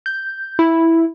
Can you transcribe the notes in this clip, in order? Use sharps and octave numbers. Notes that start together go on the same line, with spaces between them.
G6
E4